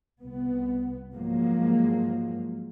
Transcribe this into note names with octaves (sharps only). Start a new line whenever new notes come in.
C2 B3
G#2 F3 F#3 G#3 A#3